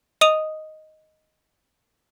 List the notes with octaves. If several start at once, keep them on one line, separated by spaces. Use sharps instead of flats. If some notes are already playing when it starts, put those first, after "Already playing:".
D#5 D#6 D#7 F7